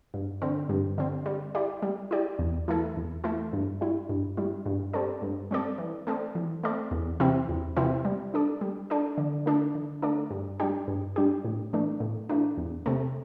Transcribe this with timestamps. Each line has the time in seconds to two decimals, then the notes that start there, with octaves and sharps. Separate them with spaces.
0.14 G2
0.42 D3 C4
0.69 G2
0.98 D3 C4
1.26 G3
1.55 E4 G4 D5
1.82 G3
2.11 E4 G4 D5
2.39 E2
2.68 E3 A3 E4 A4
2.97 E2
3.24 E3 A3 E4 A4
3.53 G2
3.81 G3 E4
4.09 G2
4.37 G3 E4
4.66 G2
4.93 G3 C4 A4 D5
5.22 G2
5.51 G3 C4 A4 D5
5.78 E3
6.07 A3 C4 A4 D5
6.35 E3
6.64 A3 C4 A4 D5
6.91 E2
7.20 C3 E3 C4 E4
7.49 E2
7.76 C3 E3 C4 E4
8.05 G3
8.34 D4 A4 D5
8.61 G3
8.90 D4 A4 D5
9.18 D3
9.46 A3 D4 A4 D5
9.75 D3
10.02 A3 D4 A4 D5
10.31 G2
10.60 G3 D4 G4
10.88 G2
11.16 G3 D4 G4
11.45 A2
11.73 E3 A3 D4
12.00 A2
12.29 E3 A3 D4
12.57 E2
12.86 C3 A3